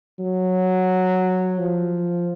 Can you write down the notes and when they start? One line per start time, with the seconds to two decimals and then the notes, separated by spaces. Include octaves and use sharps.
0.19 F#3
1.58 F3